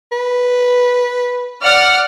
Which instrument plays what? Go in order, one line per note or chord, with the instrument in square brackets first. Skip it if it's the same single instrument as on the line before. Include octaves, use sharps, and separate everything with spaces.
[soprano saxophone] B4
[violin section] D5 F#5 F6